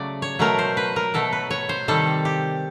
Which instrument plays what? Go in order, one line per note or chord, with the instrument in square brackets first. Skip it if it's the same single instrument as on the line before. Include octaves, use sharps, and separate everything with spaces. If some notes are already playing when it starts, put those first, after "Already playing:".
Already playing: [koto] C#3 F#3 A3 D5
C#5
B2 F#3 A3 A#4
C5
B4
A#4
B2 F#3 A3 A4
B4
C#5
C5
C3 D#3 G3 A4
G4